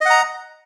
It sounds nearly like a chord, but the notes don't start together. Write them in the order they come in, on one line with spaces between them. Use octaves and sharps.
D#5 F#5 A#5